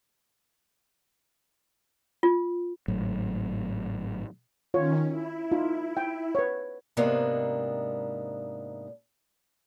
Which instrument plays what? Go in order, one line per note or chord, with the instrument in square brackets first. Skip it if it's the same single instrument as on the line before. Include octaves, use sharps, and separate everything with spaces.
[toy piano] F4
[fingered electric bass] G#1 A2 F#3
[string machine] D#3 C#4 [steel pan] F4 C#5
[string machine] E4
[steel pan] D#4 F4
G5
B4 C#5
[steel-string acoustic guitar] G#2 C3 G#3 A#3 B3 D4